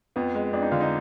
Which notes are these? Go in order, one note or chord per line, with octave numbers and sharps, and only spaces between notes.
F2 B3
G#3
F2 D4
D#4
D3 F4
D#4